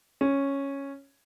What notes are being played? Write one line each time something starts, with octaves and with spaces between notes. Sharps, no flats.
C#4